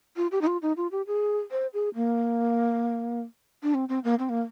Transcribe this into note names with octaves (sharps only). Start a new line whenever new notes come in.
F4
G4
D#4
F4
D#4
F4
G4
G#4
C5
G#4
A#3
D4
C4
C4
A#3
C4
A#3